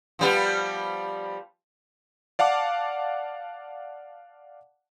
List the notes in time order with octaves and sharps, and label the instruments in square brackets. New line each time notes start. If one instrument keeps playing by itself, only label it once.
[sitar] F3 G3 B3
[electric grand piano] D5 F5 F#5 A5 D6